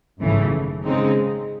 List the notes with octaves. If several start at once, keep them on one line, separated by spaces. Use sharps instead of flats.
G#1 F#2 C#3 E3 A3
C#3 G#3 C4 D#4